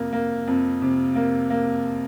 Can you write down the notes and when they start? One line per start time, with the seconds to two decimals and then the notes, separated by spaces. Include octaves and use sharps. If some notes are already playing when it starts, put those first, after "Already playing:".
Already playing: F2 C3 A#3
0.12 A#3
0.48 F2
0.82 C3
1.15 A#3
1.50 A#3